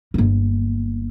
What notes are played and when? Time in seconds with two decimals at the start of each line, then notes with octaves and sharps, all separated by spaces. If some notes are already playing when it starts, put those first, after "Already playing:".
0.14 G1 A#3